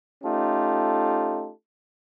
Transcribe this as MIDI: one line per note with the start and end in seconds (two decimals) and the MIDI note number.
0.23 1.50 57
0.23 1.50 61
0.23 1.50 63
0.23 1.50 65
0.23 1.50 67
0.23 1.50 69